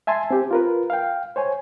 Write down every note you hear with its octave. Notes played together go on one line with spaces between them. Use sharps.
E5 G#5 A5 C6
C4 G4
F4 A#4 B4
F5 G5
C5 C#5 G#5